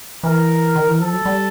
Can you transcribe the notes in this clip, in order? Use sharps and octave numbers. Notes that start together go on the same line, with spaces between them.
E3 A#4
D#3
E3
F3 A4
F#3
G3